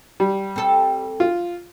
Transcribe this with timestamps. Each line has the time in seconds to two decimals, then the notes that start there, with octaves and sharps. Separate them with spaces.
0.20 G3
0.56 C4 A4
1.20 F4